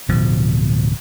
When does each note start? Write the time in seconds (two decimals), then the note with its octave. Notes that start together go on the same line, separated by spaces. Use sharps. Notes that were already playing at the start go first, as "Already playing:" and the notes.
0.08 D1 B2 F3